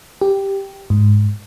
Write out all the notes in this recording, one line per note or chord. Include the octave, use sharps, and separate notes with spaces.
G4
G#2